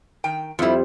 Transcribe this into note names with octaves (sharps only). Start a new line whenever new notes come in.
D#3 G5
F2 G3 E4 F4